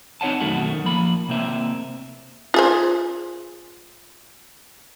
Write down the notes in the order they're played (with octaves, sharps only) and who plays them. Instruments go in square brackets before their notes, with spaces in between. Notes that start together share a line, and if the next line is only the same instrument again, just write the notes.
[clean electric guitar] C4 D#4 C#5 F#5 A5
F#2 B2 D#3 A3 F#4
F3 A#3 B5
C3 A#3 C4 E5
[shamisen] F4 G#4 C5